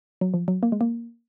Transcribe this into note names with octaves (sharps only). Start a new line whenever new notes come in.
F#3
F3
F#3
A#3
G#3
A#3